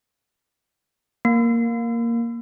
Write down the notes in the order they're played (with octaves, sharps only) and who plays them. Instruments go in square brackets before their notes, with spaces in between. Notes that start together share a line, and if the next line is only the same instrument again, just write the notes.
[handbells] A#3